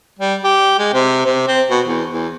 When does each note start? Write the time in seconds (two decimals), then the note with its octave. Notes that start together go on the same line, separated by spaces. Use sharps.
0.19 G3
0.44 G4
0.79 G#3
0.94 C3
1.26 C3
1.48 C4
1.70 B2
1.86 E2
2.12 E2